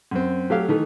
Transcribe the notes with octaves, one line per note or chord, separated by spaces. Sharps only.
F#2 C4
F#3 A3 G4 F5
D#3 E3 A3